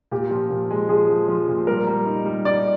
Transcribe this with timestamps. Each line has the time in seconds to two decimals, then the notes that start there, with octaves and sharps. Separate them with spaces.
0.11 A#2 G4
0.31 F3
0.50 A#2
0.71 G#3
0.89 F3 G#4
1.10 F3
1.28 F3
1.49 A#2
1.67 G3 A#4
1.87 G3
2.06 D#4
2.25 G3
2.45 D#4 D5